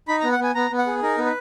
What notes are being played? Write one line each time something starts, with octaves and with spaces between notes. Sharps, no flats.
D#4 B5
A#5
B3
F#5
B3 G#5
B3 A#5
B3
F#5
G#4
D#4 A#4
B3
B4